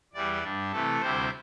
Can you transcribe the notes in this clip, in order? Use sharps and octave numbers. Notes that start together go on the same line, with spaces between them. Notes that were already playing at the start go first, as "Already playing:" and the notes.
E2 E3 G3 D5
G2 G3 D4
C3 E3 A3 A4
D2 C3 G3 C4 E4 C5